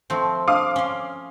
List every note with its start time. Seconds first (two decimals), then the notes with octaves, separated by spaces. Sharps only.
0.10 F3 A3 C4
0.48 F5 D6 D#6
0.76 C#4 C6